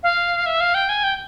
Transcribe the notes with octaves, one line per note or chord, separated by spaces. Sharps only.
F5
E5
F5
G5
G#5
G5